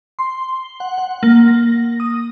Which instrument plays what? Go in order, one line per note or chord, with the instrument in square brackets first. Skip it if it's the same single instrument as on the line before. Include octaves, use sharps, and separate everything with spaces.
[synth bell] C6
F#5
F#5
A#3
A#6
D#6